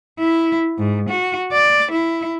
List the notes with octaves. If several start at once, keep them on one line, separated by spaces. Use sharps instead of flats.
E4
G#2
F#4
D5
E4